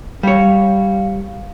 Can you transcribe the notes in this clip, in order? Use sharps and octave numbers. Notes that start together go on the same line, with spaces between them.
G3 C#5 F5